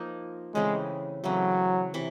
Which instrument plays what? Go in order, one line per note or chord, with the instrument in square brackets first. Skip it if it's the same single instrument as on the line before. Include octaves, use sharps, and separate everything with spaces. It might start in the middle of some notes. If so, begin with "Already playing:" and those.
Already playing: [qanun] F3 A#3 D#4
[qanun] C#3 E3 A3 C4 [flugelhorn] G#3
[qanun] C#3 E3 A3 C4 [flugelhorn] F#3
[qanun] C3 E3